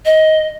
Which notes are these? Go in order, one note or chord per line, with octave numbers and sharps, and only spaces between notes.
D#5